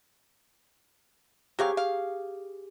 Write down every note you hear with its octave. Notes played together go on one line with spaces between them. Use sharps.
F#3 C4 G4 G#4 F5 C#6
F5